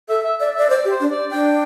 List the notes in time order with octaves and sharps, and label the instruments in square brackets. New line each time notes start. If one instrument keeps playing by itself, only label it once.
[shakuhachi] A4 [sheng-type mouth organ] E5
[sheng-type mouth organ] E5
[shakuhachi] D5 [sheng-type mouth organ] E5
[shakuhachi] D5 [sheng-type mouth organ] E5
[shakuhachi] C5 [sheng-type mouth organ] D5
[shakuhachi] G4
[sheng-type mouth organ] C5
[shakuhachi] D4
[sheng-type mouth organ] D5
[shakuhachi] D4 [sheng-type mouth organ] G5